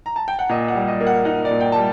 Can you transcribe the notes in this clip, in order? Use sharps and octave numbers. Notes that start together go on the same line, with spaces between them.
A#5
A5
G5
F#5
A#2 D#5
F#5
G3
D#5
A#3
F#5
D#4 F#5
D5
A#2
G5
G3 A5